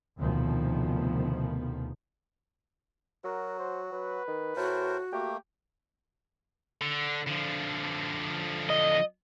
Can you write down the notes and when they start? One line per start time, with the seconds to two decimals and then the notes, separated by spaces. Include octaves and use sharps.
0.18 F1 D2 B2 D#3 F3 B3
3.24 F#3 F#4 A#4
3.59 C5
3.93 F#3 B4
4.28 D#3
4.56 A2 F#4 A#4 C5
5.13 A3 A#3 G4
6.82 D3
7.27 D3 F3
8.70 D#5